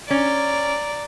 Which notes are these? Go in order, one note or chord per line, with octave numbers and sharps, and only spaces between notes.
C#4 D5 A#5